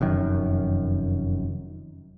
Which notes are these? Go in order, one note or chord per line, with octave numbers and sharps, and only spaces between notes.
F1 F#2 D#3